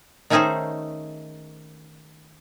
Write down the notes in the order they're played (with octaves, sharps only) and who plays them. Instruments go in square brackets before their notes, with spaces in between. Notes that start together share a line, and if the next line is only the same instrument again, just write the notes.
[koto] D#3 A3 C#4 D#4 G#4 C5